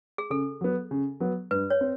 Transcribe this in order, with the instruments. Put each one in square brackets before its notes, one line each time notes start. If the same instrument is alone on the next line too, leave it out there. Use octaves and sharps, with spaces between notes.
[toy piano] G#4
[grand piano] C#3 [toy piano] A4
[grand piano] F#3 B3
C#3
F#3 B3
[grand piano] G2 [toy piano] B4
[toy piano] C#5
[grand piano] C4